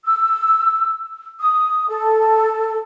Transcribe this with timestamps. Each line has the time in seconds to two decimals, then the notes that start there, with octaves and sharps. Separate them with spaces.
0.05 E6
1.39 D#6
1.88 A4